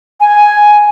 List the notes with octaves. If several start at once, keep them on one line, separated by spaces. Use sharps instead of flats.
G#5